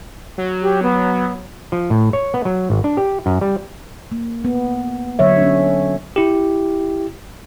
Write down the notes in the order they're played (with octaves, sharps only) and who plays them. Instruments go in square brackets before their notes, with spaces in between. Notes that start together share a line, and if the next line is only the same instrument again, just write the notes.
[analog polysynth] F#3
[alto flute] G4
B3
[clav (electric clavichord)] F3
A2
C#5
B3
F#3
G#1
D4
G4
F#2
G3
[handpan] A#3
B3
D3 F#3 C#5 E5
C#4 D4
[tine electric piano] E4 G4